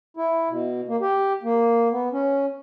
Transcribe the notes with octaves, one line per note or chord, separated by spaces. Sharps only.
E4
B2
A#3
G4
A#3
B3
C#4